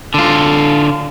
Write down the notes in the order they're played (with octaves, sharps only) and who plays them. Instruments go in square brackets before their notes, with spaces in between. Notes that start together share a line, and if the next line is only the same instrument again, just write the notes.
[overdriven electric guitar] D3 F4